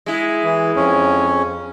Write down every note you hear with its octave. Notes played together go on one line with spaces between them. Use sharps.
G#3 E4
E3
F2 C#4